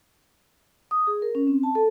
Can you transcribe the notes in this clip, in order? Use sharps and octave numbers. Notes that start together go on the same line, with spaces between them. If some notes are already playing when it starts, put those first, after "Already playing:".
D#6
G#4
A#4
C#4
C4
A5
A4